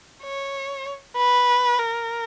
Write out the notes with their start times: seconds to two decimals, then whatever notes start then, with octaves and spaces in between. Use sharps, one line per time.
0.23 C#5
1.17 B4
1.79 A#4